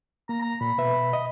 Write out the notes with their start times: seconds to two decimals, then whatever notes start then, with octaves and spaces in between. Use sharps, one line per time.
0.29 A#3 A#5
0.41 A#5
0.61 A#2 B5
0.78 B2 B4 E5
1.13 D#5